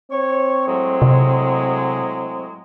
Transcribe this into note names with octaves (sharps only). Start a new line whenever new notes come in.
C4 C#5
A2 F#3 G#3
C3